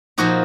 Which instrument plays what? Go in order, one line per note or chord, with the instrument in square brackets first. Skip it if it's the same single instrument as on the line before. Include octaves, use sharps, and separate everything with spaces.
[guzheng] A#2 F3 A#3 D#4 F#4